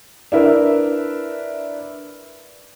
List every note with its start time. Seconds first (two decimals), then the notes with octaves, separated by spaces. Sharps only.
0.32 D4 E4 A#4 B4 E5